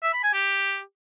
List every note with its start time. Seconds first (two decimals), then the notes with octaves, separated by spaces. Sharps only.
0.03 E5
0.13 B5
0.24 G#5
0.34 G4